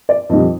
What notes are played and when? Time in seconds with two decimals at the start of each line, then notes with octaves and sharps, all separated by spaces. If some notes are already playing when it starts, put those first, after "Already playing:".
0.09 D5
0.29 F2 D#3 G3 D#5